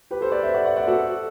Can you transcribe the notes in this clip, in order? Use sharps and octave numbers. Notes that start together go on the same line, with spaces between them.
G4 B4
A4 C5
B4 D5
C5 E5
D5 F#5
D5 F#5
D5 F#5
F#4 A4